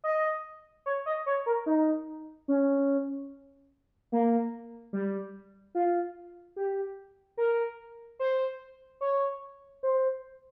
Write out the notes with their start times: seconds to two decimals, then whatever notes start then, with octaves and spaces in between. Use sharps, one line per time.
0.04 D#5
0.86 C#5
1.06 D#5
1.26 C#5
1.46 A#4
1.66 D#4
2.48 C#4
4.12 A#3
4.93 G3
5.75 F4
6.56 G4
7.37 A#4
8.19 C5
9.01 C#5
9.83 C5